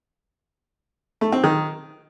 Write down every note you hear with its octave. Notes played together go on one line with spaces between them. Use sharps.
A3
C4
D#3